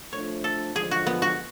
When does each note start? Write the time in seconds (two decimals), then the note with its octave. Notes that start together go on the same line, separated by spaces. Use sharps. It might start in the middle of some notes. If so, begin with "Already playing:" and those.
0.13 F3 A3 D4 C#5
0.44 A4
0.76 D3 F3 G#3 G#4
0.91 F#4
1.07 B3
1.22 F#4